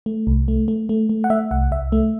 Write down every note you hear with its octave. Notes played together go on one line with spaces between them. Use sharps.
A3
C2
A3
A3
A3
A3
F#5
A3 E5
C2 F#5
C2 E5
A3